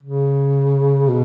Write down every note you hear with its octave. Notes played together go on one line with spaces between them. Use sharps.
C#3
B2